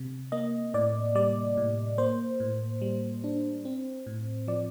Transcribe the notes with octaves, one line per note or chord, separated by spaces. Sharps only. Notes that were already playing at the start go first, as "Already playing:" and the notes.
Already playing: C3
A#3 D#5
A2 D5
G3 D5
A2
A#3 C5
A2
G3
D4
C4
A2
F3 D5